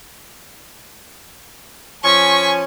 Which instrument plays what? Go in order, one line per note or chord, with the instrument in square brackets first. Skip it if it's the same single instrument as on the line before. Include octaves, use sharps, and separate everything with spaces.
[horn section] F3 C#4 G#5 [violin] C#6 B6